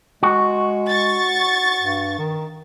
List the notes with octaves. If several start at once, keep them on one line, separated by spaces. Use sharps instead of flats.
G#3 F#4
C#6 A6
G2
D#3